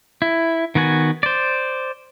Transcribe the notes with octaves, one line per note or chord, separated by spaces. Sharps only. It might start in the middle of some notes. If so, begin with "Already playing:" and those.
E4
D#3 B3 F#4 G#5
C5 D5